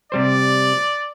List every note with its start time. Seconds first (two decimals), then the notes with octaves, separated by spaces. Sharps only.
0.12 C3 G3 C5 D5